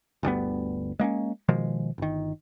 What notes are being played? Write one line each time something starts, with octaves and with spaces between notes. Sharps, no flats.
G1 D2 G3 B3
G#3 A#3 C4 C#4
B2 D#3 F3 G#3
G1 D#3